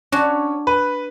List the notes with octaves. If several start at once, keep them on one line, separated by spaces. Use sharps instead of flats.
C#4 D4 F#4
B4